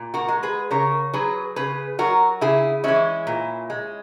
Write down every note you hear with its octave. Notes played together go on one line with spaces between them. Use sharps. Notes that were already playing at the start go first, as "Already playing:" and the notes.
Already playing: A#2
F#4 A#4
G#3
G#4 B4
C#3 A#4 C#5
F#3 G#4 B4
C#3 G#4 B4
F#3 F#4 A#4
C#3 E4 G#4
E3 G#3 C#4 E4
A#2
G#3